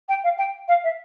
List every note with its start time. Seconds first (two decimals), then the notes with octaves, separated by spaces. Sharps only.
0.09 G5
0.24 F5
0.38 G5
0.68 F5
0.84 E5